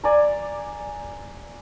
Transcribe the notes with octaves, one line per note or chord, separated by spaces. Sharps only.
D5 G#5 A#5